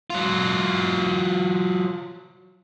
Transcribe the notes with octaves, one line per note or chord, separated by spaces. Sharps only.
F#3 F4